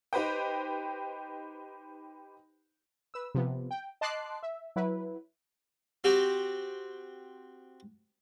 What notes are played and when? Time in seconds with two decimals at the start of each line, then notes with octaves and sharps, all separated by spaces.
0.13 D#4 G4 B4 C5 G5
3.14 B4 E6
3.35 C3 F3 B3
3.71 G5
4.01 D#5 A5 C6 D6 F#6 C7
4.43 E5
4.76 F#3 E4 B4
6.04 C4 F#4 G4